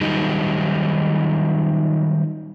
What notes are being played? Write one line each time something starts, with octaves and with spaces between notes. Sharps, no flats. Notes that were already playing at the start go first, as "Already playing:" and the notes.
D#3 F#3 G3 D#4